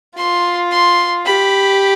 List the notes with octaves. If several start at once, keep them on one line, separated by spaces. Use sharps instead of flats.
F4 C6
C6
G4 B5